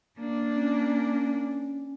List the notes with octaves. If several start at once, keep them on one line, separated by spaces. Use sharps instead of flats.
A#3 D4
C#4